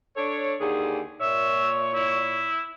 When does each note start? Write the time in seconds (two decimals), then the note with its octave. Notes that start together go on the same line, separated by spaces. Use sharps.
0.17 D4 A4 C#5
0.60 D#2 D3 G#4
1.21 A#2 C#5 E5
1.94 E4